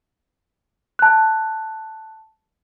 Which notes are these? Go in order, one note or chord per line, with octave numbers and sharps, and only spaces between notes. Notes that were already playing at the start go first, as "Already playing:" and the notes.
A5 F#6